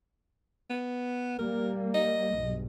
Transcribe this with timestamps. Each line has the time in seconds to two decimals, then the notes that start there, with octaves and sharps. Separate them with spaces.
0.70 B3
1.38 G3 A#3 A#4
1.94 D#5
2.33 B1 G2